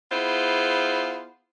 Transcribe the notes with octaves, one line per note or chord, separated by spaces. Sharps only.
B3 E4 F4 G#4 C5